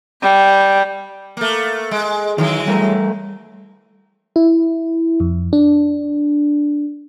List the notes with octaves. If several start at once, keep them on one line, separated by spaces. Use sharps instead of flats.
G3
A3 A#3
G#3
D#3 E3 F#3 G#3
G3 A3 A#4
E4
F2
D4